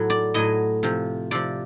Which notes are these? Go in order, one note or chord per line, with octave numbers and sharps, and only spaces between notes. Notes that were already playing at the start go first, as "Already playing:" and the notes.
Already playing: A2 F#3
D5
A2 F#3 D#5
C3 F3
C3 F3 D5